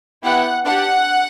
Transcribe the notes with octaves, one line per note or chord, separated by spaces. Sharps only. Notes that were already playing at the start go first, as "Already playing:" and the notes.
B3 E4 G4 F#5
D4 G4 F#5